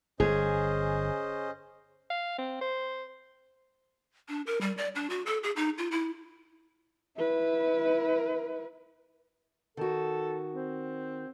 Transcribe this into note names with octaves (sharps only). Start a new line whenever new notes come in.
G1 C#4 G#4 C5 D#5
F5
C4
C5
D4
A#4
G3
D5
D4
F#4
A4
G#4
D#4
F4
E4
E4 B4
D#3 F#4 A4
C4